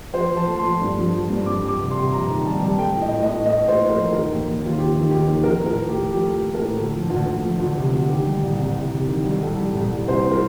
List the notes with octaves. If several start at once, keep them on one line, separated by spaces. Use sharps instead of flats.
F3 C5
F3
A5
A3
C6
F3
G2
F3
F3
G2
F2 D6
G3
D6
C3
C6
C3
F2 A#5
D#3
G3 A5
G3
A3 G5
A2
D#5
A2
D#5
A2
A3 D#5
A3
C5
A2
A#4
F3
D#3 A#4
D#2
D#2
D#2 F4
D#3 G4
D#3
D#2 G4
D#3
F3 A#4
A2 A#4
A2
A3 G4
F3 G4
A3
A4
A3
A#4
A2
D2 A4
F3
D2
D2
F3
D2
C3
D2
D#3 G4
G3
C2
C2
C3
C3
D#3
G3
C2 A4
G3
C2
C2
C2 C5
A#4